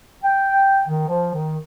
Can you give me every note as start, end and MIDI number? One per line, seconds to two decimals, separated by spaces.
0.23 0.82 79
0.87 1.04 51
1.08 1.30 53
1.34 1.58 51